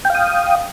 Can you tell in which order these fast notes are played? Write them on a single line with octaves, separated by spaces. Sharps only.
G5 F5 D#6